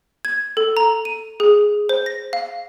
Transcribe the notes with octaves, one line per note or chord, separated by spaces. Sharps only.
G#6
A4
A#5
D#7
G#4
C5
A#6
F5